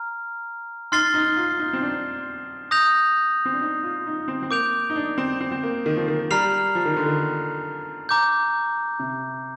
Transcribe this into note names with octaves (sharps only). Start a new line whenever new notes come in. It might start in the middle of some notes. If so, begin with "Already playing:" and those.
Already playing: A#5 F6
D#4 C6 F6 A6 C7 G7
D#4
F4
D#4
C4
D4
D#6 G6 A#6 F7
C4
D4
D#4
F4
D#4
C4
C4
A#3 D6 G6 D7 F7
D#4
D4
C4
C4
C4
A#3
D#3
F3
D#3
G3 A#5 F6 C7 F7
F3
D#3
D3
D#3
A#5 D6 G6
C3